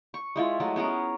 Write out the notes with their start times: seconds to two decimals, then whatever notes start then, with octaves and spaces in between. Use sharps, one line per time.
0.14 C#6
0.36 G#3 E4 F4
0.60 F#3 G#3 A3
0.76 B3 C#4 G#4 A#4